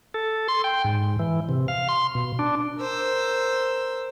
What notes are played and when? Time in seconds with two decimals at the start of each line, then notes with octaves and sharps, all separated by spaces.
0.14 A4
0.48 C6
0.64 G5
0.85 G#2
1.19 E3
1.49 C3
1.68 F5
1.88 C6
2.15 B2
2.39 D4
2.78 A#4 C5 E6